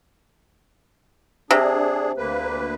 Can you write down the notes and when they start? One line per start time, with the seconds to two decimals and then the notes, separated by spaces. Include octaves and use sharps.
1.51 C3 D4 G#4
2.17 D2 A#3 B4